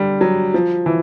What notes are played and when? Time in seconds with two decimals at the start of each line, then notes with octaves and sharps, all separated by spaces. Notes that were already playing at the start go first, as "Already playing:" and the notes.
Already playing: D3 G3
0.21 F#3
0.54 F3
0.86 E3